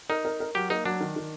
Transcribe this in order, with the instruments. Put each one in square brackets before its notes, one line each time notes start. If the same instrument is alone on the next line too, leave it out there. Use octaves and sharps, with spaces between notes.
[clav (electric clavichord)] D#4 [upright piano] A#4
[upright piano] A#4
A#4
[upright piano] F#3 [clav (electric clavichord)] G4
[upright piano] A#3 [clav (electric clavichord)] D#4
[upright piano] F#3 [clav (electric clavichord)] D4
[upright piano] D#3
D#3